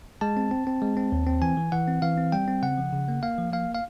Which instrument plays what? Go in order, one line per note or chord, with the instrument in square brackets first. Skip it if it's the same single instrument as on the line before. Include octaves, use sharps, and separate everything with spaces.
[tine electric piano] G#3 A5
C4
C4
C4
G#3
C4
D#2
C4
E3 G#5
E3
E3 F#5
C4
E3 F5
C4
G3 G5
C4
C#3 F#5
F3
C#3
A#3
A#3 F5
F3
A#3 F5
F5